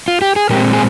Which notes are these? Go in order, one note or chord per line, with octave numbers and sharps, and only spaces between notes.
F4
G4
G#4
A#2 G#3 C4 G4 A#4
G#4